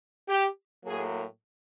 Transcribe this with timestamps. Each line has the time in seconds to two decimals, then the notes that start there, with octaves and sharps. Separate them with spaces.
0.29 G4
0.85 A2 F#3 A#3 G#4